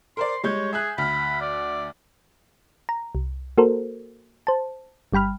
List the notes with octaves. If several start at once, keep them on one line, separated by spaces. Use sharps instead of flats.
A#4 C5 D5 C6
G3 G#3 C#5 G6
G#4 E5 G#5 F#6
D2 B5 F6
D5
A#5
C2
A#3 F#4 A4 A#4 C5
C5 A5
G1 G3 G5 B5 F6